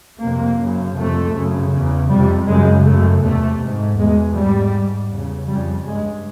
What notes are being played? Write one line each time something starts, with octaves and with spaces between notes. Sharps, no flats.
F2 C3 A#3
F#2 C#3
F2 C3 A3
F#2 C#3
E2 C#3
F2 C3 G3
F#2 C#3 G#3
F#2 C#3 A3
E2 C3 A3
G#2
E2 B2 G#3
G#2 G3
G#2
E2 C#3
F2 C#3 G3
G2 G#3